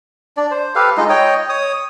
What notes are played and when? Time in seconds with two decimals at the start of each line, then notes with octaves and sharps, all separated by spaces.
0.37 D4 D5
0.51 C5
0.75 G4 A4 B4 F5
0.97 G#3 D#4 F4 D#5
1.09 C#5 D#5 G5
1.49 C#5 D#6